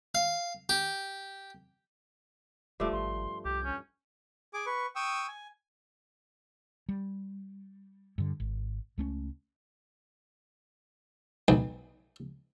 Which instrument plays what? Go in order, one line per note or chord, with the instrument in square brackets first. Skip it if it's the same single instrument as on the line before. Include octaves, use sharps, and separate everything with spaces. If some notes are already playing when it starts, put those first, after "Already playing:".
[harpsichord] F5
G4
[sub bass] D#1 [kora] G2 F3 A3 [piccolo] D6
[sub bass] G#1 [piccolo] C6
[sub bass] C2 [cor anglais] G4 [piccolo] G6
[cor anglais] C#4
[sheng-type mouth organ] G#4 D6
B4 C#6
G5 C#6 D#6 E6
G#5
[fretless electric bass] G3
G2 D3
G#1
C#2 A3 C#4
[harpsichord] B1